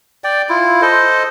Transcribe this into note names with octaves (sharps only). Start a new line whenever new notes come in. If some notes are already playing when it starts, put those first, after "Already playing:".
D5 G5
E4 F4
A4 C5 D#5